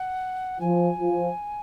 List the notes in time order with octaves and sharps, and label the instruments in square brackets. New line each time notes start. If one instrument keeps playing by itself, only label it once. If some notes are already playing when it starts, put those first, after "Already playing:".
Already playing: [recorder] F#5
[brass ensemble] F3 [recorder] G#5
[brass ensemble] F3